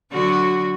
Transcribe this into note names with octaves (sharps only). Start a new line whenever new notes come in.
D3 F#3 F#4